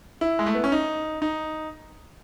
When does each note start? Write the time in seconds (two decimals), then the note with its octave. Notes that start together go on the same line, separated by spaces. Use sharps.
0.21 E4
0.39 G#3
0.46 A3
0.55 B3
0.64 C#4
0.72 D#4
1.22 D#4